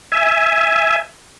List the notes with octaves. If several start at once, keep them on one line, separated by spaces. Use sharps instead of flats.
E5 G#5